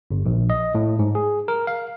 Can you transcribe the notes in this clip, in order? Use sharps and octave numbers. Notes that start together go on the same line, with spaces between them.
G1
A#1
D#5
A2
G#2
G#4
A#4
F5